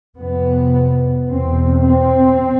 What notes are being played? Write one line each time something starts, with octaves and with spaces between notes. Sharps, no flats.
F2 C3 B3
E2 B2 C4
C4